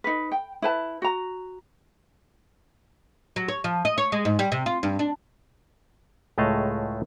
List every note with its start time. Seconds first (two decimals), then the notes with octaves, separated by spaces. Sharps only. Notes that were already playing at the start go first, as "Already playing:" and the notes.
0.04 D#4 B4
0.32 G5
0.62 E4 B4 A5
1.02 F#4 A#5
3.36 F#3
3.48 C#5
3.64 F3
3.85 D#5
3.98 C#5
4.12 G#3
4.25 G#2
4.39 G3
4.52 C3
4.66 F4
4.83 G2
4.99 D4
6.38 C#2 A2 G#3 A3 D#5 F5